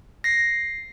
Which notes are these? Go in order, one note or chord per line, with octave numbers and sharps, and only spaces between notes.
A#6 C7